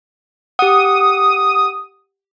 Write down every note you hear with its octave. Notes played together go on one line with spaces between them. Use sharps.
G4 F#5 D#6